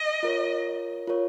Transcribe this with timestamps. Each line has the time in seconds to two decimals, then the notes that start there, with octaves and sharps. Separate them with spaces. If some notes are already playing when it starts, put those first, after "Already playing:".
Already playing: D#5
0.23 F4 A#4 C#5
1.07 F4 A#4 C#5